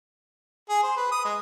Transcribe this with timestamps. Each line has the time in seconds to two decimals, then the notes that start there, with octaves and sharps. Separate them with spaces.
0.70 G#4
0.83 C5
0.97 B4
1.12 D#6
1.25 G#3